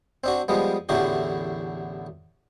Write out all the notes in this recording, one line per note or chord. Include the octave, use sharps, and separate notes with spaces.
C4 D4 F#4
F3 G3 G#3 B3
A1 E2 A2 D3 F#4 G4